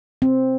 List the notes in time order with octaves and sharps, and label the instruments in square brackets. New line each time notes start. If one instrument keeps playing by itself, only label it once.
[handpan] C4